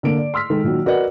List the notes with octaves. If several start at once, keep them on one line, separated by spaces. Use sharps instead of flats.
D3 A#3 D7
D5
C6 E6 F6 B6
D#3 G#3 A4
A#2 D#3 F#3
F#4 A#4 B4 D5 D#5 F#5